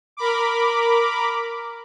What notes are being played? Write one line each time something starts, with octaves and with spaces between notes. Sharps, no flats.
A#4 B5 D6